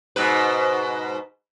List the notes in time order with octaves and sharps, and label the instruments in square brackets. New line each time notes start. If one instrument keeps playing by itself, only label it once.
[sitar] G#2 B2 B4